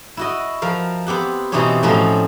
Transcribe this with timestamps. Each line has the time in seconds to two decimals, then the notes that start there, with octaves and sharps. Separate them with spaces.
0.17 E4 F#4 D#5
0.62 F3 A#4 F5
1.07 B3 C4 G4 F#5
1.52 B2 E3 C4 D#4 G4 C#5
1.83 A2 F3 C4 C#4 D#4 F#4